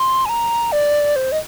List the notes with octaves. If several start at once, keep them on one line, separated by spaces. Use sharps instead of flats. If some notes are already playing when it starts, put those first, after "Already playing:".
Already playing: C6
G#5
A#5
D5
C5
D#5